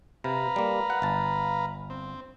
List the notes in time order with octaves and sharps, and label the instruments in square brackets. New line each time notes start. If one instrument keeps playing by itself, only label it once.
[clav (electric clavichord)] C3 [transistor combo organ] B4 F5 A#5
[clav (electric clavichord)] G3 A#3
F#5
G1 A5
[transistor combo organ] C4